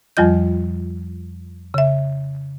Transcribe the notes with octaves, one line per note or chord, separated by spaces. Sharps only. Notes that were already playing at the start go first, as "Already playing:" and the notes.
F2 F3 G3 F4 D#5 G6
C#3 E5